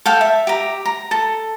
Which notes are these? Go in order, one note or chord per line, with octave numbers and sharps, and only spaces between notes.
A4 F5 G5
E5
G4 A#5
A#5
A4